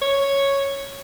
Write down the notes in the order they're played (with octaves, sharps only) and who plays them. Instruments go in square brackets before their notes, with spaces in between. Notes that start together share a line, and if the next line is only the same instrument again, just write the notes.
[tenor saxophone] C#5